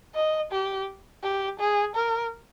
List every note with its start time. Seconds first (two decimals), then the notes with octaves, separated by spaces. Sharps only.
0.15 D#5
0.52 G4
1.23 G4
1.59 G#4
1.96 A#4